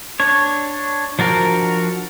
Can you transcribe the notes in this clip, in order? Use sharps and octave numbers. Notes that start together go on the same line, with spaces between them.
D4 C#5
F3 D4 F#4 A#4